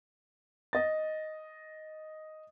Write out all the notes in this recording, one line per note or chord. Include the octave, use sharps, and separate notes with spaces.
D#5 A6